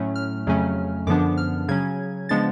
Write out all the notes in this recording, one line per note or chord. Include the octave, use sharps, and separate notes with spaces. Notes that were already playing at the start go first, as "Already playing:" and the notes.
Already playing: A2 F#3 A3 C#4
F6
F2 C#3 F#3 A3 C#4
F#2 D3 F3 B3 D4 D6
F6
C#3 F#3 C#4 G#6
C#3 F3 G#3 B3 D4 A6